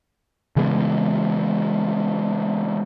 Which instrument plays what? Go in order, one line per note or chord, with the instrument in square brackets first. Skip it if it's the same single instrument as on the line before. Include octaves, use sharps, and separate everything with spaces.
[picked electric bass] C#3 E3 G#3 B3